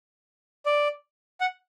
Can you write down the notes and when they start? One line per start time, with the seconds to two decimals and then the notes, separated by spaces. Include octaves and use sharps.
0.66 D5
1.41 F#5